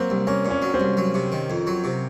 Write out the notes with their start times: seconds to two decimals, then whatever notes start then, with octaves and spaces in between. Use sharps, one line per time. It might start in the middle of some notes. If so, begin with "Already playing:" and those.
Already playing: F#3 A#3 C4
0.10 C2
0.27 A#3 C#4
0.45 A#2
0.50 C#4
0.62 F#3
0.74 C4
0.80 C2
0.97 F#3
1.14 C3
1.32 D#3
1.50 F2
1.67 F#3
1.84 C3